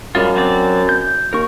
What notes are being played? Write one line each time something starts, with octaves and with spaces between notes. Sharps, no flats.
F#2 G3 G#3 F4
F#3 C4 D5
G6
D#2 A#4 C#6